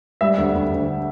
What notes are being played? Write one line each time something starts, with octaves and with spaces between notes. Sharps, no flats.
G3 E5
D2
D2
D2